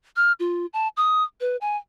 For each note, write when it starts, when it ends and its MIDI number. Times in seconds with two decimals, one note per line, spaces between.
0.16 0.32 89
0.40 0.66 65
0.73 0.88 81
0.97 1.24 87
1.41 1.57 71
1.61 1.77 80